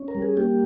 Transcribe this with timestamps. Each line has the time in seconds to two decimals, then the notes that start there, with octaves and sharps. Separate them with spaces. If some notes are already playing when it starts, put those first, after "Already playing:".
Already playing: C#4
0.08 A#4
0.15 G3
0.22 G#4
0.37 A#3 G4